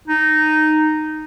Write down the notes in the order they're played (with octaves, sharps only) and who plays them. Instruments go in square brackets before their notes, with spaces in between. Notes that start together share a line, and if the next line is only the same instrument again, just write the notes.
[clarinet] D#4